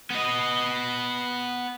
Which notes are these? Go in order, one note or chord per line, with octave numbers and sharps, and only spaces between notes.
B3 D#5